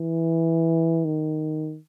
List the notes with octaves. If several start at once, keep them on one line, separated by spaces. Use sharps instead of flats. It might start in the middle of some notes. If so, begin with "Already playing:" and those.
Already playing: E3
D#3